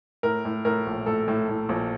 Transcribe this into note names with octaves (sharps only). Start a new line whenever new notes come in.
A2 A#4
A2
A2 A#4
A#1
A2 A4
A2
A2
A#1